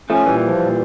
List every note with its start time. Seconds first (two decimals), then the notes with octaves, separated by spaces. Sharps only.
0.10 F3 A3 C#4
0.26 A#2 E3 G3
0.43 F3
0.60 A#2